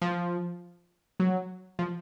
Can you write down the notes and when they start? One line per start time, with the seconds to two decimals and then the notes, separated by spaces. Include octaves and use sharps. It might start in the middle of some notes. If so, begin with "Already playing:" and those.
0.02 F3
1.20 F#3
1.79 F3